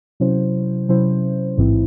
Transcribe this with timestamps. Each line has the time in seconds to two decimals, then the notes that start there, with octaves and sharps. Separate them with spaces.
0.20 C3 F#3 C#4 E4 C5
0.89 C3 F#3 C#4 E4 C5
1.57 A1 G#2 E3 C4 E4